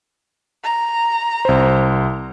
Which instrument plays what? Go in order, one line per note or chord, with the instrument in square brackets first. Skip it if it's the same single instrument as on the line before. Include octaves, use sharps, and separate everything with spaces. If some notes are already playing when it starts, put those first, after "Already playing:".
[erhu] A#5
[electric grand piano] C2 C5